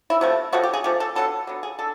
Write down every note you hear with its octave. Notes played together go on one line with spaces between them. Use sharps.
E4
C3 F3 A3
C3 F3 A3 F#4
G4
G#4
C3 F3 A3 G4
A4
D3 F#3 B3 A4
D3 F#3 B3
G#4
D3 A4